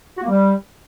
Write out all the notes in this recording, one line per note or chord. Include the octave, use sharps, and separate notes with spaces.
F#4
A#3
G3